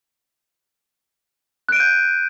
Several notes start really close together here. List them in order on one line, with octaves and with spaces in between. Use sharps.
F#6 D7 D#7 G6